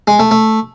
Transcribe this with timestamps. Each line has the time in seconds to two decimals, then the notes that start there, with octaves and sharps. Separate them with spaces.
0.07 G#3
0.19 A3
0.31 A3